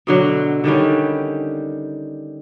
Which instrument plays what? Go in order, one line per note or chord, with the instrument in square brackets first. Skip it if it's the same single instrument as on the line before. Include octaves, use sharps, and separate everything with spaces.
[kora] B2 D3 F#3
D3 D#3 G3 C#4